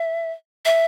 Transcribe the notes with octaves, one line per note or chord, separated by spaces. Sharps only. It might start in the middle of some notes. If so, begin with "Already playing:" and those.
Already playing: E5
E5